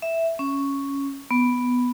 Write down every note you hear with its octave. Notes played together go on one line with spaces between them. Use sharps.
E5
C#4
B3